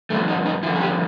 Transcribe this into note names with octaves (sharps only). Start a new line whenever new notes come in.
G2 D3 F3 A3
D#4
D#4
G2 D3 F3 E4
G#4
G4